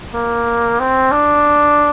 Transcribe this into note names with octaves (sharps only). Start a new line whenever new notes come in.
A#3
C4
D4